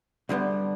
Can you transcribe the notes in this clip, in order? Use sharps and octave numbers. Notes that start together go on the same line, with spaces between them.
D2 D3 G3 B3